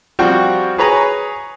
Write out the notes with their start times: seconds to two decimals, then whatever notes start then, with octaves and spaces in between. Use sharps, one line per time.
0.19 F3 G3 C4 F#4 G5 C#6
0.78 G#4 B4 C#5 G#5 A#5